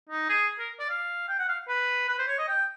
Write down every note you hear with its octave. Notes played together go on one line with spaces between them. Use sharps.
D#4
G#4
A#4
D5
F5
G5
F#5
F5
B4
B4
C5
C#5
D#5
G5